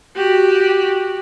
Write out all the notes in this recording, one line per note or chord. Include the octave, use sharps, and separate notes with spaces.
F#4 G4